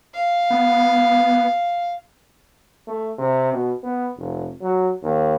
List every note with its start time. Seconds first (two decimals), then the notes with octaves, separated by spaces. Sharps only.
0.14 F5
0.50 B3
2.87 A3
3.19 C3
3.53 B2
3.83 B3
4.18 F1
4.62 F#3
5.03 D#2